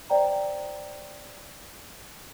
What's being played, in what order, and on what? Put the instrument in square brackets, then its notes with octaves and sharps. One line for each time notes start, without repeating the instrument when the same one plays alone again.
[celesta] C5 D5 G5 A#5